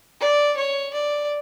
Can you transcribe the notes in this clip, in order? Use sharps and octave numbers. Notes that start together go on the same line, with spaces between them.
D5
C#5
D5